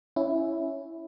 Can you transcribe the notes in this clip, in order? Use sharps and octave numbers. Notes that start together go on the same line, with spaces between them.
C#4 E4